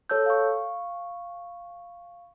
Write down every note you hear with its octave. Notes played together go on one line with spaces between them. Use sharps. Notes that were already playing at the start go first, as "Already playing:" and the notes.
A4 C#5 A5 E6 G6
F5 C#6